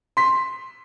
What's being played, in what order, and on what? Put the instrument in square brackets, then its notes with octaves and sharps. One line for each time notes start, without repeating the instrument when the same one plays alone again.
[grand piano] C6 B6